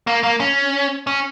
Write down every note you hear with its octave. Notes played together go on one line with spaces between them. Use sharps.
A#3
A#3
C#4
C#4